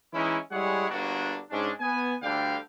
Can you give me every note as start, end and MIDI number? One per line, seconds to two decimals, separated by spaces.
0.13 0.37 52
0.13 0.37 56
0.13 0.37 61
0.13 0.37 63
0.13 0.37 64
0.51 0.88 55
0.51 0.88 56
0.51 0.88 64
0.51 0.88 68
0.51 0.88 73
0.51 0.88 78
0.90 1.40 31
0.90 1.40 43
0.90 1.40 50
0.90 1.40 58
0.90 1.40 62
0.90 1.40 66
1.50 1.70 44
1.50 1.70 56
1.50 1.70 61
1.50 1.70 62
1.80 2.14 59
1.80 2.14 80
2.22 2.57 38
2.22 2.57 50
2.22 2.57 55
2.22 2.57 77
2.22 2.57 79